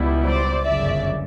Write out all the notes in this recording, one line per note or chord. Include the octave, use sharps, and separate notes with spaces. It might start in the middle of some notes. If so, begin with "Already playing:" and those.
Already playing: C#2 B2 G3 B3 E4
C5 D5
G1 F#2 C#3 D5 E5